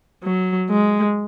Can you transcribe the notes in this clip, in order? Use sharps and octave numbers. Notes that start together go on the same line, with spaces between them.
F#3
G#3